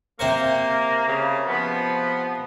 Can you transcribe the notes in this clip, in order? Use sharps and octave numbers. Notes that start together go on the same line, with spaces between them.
C3 A#3 C5 C#6
C#3
F3 B3